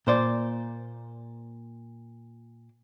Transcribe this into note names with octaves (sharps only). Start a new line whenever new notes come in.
A#2 C5 D5